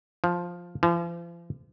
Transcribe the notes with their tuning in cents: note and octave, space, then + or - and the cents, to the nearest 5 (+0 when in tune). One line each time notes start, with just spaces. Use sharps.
F3 +5
F3 -40